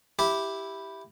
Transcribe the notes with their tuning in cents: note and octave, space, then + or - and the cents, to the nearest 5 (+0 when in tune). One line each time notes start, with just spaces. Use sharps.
E4 +0 G4 +0